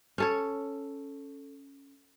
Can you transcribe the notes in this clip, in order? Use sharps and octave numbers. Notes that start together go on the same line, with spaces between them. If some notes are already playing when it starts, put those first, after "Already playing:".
C#4 A4 C#5